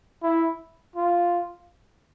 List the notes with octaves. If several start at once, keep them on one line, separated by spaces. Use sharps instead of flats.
E4
F4